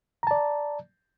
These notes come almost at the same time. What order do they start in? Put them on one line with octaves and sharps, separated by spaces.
A#5 A5 D5